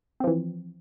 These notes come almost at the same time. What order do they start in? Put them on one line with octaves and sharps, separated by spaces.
C4 F3 E3